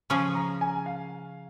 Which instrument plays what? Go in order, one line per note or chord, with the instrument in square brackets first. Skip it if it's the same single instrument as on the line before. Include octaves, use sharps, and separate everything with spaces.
[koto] C#3 F3 C#4 G#4 [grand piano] C#6
[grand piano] A#5
G#5
F5